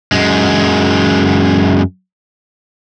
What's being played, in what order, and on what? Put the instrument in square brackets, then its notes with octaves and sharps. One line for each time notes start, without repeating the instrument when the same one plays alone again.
[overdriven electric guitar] F#2 G#3